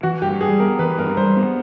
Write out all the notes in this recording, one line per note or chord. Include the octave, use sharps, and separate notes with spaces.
E3 F#4
G2 G4
G3 G#4
B3 A#4
E3 B4
G2 A#4
G3 C5
B3